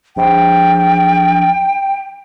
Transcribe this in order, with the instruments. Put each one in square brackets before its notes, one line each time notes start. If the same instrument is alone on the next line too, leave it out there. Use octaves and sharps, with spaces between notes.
[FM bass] A#1 [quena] G5